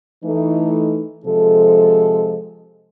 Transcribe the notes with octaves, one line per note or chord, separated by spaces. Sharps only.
E3 A3 D#4
C3 F3 G#3 A4